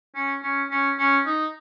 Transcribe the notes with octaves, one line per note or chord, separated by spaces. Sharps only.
C#4
C#4
C#4
C#4
D#4